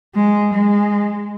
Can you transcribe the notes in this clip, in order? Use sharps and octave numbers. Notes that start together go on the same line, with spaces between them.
G#3
G#3